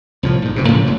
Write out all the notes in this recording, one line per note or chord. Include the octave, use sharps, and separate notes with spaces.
C2 A2 F3
A#1 G#2
F#1 F#2 C3
A2 C#3 F3 A#3
F#1 F2